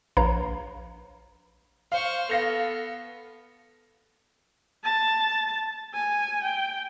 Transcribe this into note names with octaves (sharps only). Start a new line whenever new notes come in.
A#1 B4 C#5 F5 A#5 B5
C5 F5 C#6
B3 A4 F5 A#6 F7
A5
G#5
G5